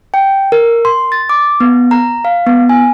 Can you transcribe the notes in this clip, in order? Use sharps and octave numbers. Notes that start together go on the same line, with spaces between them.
G5
A#4
C6
A6
D6
B3
A#5
F5
B3
G#5